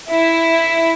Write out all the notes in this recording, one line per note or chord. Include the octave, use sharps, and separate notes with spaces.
E4